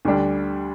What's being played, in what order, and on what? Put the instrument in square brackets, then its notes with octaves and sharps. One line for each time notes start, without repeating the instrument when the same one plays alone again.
[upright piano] D2 D3 G3 D4